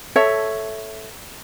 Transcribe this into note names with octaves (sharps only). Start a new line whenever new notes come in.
A4 C#5 E5